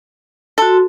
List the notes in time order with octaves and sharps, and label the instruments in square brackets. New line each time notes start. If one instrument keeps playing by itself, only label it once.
[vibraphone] F#4 C6 [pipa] A4